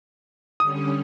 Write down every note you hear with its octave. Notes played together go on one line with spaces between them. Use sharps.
D3 G3 C#4 D#6